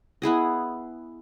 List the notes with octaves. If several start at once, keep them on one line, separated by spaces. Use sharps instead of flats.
B3 E4 G#4 D#5